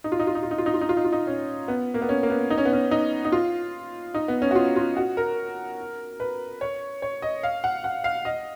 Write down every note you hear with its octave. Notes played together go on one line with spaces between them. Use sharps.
D#4
F4
D#4
F4
D#4
F4
D#4
F4
D#4
F4
D#4
F4
D#4
F4
D#4
C#4
B3
A#3
B3
C#4
A#3
B3
D#4
C#4
B3
C#4
D#4
D#4
F4
D#4
B3
C#4
F#4
F4
F4
F#4
A#4
B4
C#5
C#5
D#5
F5
F#5
F#5
F5
D#5